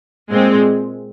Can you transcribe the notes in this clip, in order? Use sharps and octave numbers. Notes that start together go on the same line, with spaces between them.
A#2 G#3 C4